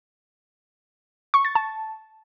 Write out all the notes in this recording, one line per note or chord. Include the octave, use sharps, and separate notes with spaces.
C#6
A6
A5